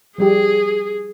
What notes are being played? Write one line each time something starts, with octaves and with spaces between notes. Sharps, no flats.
F3 G3 G4 G#4